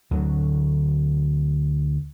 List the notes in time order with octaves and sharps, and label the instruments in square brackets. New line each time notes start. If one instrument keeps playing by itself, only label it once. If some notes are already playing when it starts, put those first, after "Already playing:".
[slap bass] D2 D3 F#3